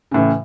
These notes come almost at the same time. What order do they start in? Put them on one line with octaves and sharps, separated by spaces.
C#3 A2 E3